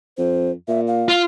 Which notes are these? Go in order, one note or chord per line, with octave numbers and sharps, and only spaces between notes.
F2 C5
A#2 E5
F5
F4